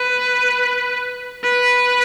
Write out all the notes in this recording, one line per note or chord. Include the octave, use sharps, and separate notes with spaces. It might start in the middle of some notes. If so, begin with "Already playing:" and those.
Already playing: B4
B4